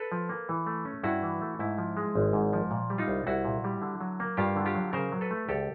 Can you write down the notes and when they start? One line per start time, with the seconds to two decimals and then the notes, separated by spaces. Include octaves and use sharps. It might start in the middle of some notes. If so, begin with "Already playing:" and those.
Already playing: A4 B4
0.12 F3
0.29 A#3
0.49 E3
0.66 A3
0.85 C#4
1.03 G2 E4 F#4
1.23 E3
1.41 A3
1.59 G#2 E4
1.78 F3
1.97 G#3
2.15 G#1
2.33 G#2
2.53 F3
2.71 A#2
2.90 G3
2.98 D#4 F4
3.08 C2
3.27 C2 E4 F#4
3.45 A#2
3.64 G3
3.82 D3
4.01 F#3
4.20 A#3
4.37 G2 F4 G4
4.56 D3
4.66 F4 G4
4.75 F#3
4.93 C#3 A#4 C5
5.12 F#3
5.21 A4 B4
5.31 A3
5.49 C#2 G4 A4